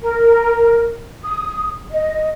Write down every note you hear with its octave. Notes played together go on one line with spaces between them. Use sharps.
A#4
D#6
D#5